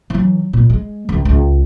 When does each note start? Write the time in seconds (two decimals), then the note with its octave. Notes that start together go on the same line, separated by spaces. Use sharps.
0.10 E3 F#3
0.53 A#2
0.70 G#3
1.09 C#2 F3
1.25 C#2